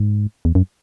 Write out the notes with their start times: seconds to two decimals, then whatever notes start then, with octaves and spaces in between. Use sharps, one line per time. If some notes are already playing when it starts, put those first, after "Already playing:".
Already playing: G#2
0.45 E2
0.55 F#2